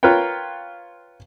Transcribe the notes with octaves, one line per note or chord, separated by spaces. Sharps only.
F4 A#4 B4 C#5 G5